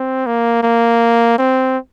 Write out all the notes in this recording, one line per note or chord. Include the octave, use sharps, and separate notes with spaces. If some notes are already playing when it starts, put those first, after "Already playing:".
Already playing: C4
A#3
A#3
C4